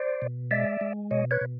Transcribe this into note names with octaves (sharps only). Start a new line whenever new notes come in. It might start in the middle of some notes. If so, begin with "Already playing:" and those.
Already playing: C5 D5
B2
G#3 D5 E5
G#3
B2 C#5 D#5
B4 C#5
B2